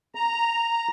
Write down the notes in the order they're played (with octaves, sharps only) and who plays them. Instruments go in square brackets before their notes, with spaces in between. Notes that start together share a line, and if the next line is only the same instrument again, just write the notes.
[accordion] A#5